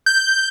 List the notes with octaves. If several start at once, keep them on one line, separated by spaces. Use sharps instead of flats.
G6